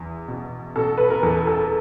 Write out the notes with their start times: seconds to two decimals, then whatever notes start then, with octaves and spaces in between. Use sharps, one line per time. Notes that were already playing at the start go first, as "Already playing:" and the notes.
Already playing: E2
0.28 B2
0.76 B2 A4
0.98 B4
1.10 A#4
1.23 E2 A4
1.47 A4